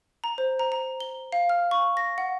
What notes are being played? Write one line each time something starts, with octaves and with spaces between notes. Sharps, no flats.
A#5
C5
A#5
A#5
G7
F5
F6
C#6
A#6
F#5